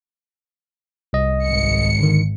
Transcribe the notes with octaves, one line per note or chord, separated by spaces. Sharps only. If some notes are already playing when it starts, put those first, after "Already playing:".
C2 D#5
G#1 C#7
D3 D#3